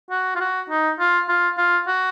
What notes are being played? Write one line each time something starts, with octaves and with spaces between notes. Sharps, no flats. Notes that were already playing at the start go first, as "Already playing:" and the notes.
F#4
F4
F#4
D#4
F4
F4
F4
F#4